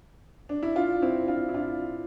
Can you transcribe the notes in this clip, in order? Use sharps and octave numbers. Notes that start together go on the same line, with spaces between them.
D4
E4
D4 F4
C4 E4
D4 F4
E4
D4 F4